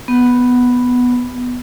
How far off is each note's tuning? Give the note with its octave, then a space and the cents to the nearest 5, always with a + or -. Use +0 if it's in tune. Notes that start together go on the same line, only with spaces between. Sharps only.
B3 +0